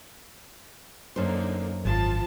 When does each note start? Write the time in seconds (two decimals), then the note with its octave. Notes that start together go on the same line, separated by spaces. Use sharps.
1.16 F#2 D3 A#3 D#4 C5
1.85 G#1 F3 F4 A5